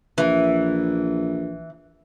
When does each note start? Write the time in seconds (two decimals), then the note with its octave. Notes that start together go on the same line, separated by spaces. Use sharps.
0.18 A#1 E3